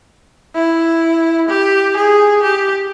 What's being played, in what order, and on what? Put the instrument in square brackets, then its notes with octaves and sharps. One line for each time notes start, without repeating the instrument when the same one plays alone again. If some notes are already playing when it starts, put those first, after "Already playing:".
[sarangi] E4
G4
G#4
G4